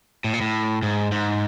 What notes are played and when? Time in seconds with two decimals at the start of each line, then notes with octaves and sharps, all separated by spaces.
0.24 A2
0.33 A#2
0.41 A2
0.83 G#2
1.12 G#2